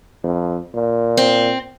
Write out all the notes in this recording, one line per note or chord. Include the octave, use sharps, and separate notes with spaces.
F2
A#2
C4